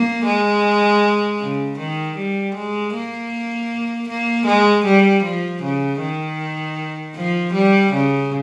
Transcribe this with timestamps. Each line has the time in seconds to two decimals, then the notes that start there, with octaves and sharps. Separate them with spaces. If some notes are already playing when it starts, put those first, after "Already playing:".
Already playing: A#3
0.25 G#3
1.40 C#3
1.79 D#3
2.17 G3
2.55 G#3
2.94 A#3
4.08 A#3
4.46 G#3
4.85 G3
5.23 F3
5.62 C#3
6.00 D#3
7.16 F3
7.53 G3
7.92 C#3